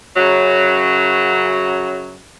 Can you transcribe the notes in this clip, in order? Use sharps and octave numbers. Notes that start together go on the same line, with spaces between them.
F#2 C#3 F#3